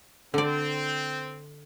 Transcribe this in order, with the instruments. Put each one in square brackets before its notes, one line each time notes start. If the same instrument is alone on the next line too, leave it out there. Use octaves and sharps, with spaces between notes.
[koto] D3 D5 [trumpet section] C4